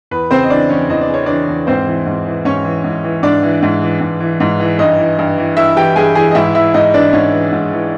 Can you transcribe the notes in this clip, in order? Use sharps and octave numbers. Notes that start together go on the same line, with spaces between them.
E2 B4
C#3 C4 C5
D#5
E3 D4 D5
E2 C#4 C#5
E2 D#5
D5
C#3
C#5
E3 D4 D5
E2
G#2 C4 C5
E3
G#2
E3
G#2 C#4 C#5
E3
G#2
E3
G#2 D4 D5
E3
G#2
E3
G#2
E3
G#2
E3
G2 D#4 D#5
E3
G2
E3
G2 E4 E5
E3 G4 G5
G2 G#4 G#5
E3 G#4 G#5
D#5
G#2 E4 E5
E3 E4 E5
G#2 D#4 D#5
E3 D4 D5
G#2 C#4 C#5
E3
G#2
E3